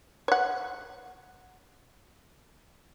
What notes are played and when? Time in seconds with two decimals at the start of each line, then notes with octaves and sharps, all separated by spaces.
0.28 C#5 F#5